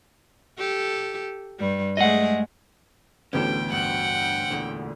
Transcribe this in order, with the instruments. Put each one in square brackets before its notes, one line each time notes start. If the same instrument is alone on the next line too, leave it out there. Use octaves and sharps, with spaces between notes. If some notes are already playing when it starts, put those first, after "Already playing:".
[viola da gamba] G4 A4
G2 G3
[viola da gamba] G#3 A3 G#4 [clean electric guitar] D#5 F#5
[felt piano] A1 D2 B3 [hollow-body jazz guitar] C#4 G4 A4 [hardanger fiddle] G5
[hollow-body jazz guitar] G2 [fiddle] F#5 [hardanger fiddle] G5
[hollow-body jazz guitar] E2 A#2 D3